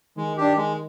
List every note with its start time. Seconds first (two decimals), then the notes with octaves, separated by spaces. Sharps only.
0.17 D#3 G#3
0.37 D4 G4
0.57 G#3